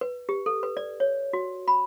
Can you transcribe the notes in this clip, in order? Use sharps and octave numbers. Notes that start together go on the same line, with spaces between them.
B4
G4
A4
B4
D5
C#5
F#4
B5